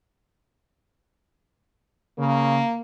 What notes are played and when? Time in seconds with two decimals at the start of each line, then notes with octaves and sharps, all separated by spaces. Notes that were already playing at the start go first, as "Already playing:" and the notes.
2.18 C#3 A#3